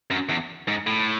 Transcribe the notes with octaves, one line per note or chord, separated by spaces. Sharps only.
F#2
E2
G#2
A2